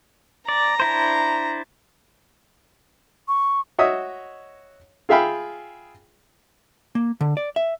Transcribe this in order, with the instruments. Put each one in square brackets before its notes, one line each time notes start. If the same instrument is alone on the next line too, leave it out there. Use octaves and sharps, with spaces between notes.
[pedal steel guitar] D5 [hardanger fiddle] A#5
[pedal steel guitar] D4 E4 C5
[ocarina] C#6
[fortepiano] F#4 C#5 D#5 E5 D#6
F4 G#4 E5 F5 G5 B5
[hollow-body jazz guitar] A#3
D3
D5
E5